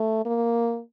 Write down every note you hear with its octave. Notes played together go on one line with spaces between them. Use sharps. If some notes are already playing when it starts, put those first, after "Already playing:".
Already playing: A3
A#3